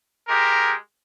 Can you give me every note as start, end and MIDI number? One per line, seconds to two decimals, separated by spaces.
0.28 0.73 56
0.28 0.73 67
0.28 0.73 70